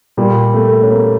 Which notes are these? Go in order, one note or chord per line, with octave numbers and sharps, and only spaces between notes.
A#2 G3
A3
C#4
A#3